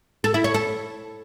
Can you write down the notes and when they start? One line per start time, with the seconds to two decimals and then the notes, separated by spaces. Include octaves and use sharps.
0.24 A4
0.34 E4
0.44 C#5
0.54 A4